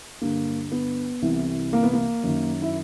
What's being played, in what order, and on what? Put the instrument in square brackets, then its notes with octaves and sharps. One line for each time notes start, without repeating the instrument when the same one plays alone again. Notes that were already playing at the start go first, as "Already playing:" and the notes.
[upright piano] G2 D3 A#3
B3
C2 C3 E3
A#3
B3
A#3
F#2 D#3
E4